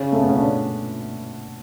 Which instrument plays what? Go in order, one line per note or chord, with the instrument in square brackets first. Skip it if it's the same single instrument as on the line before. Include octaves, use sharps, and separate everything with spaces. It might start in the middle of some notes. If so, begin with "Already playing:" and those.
Already playing: [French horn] C#3 [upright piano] C#4
[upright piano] A3
B3
C#4
D4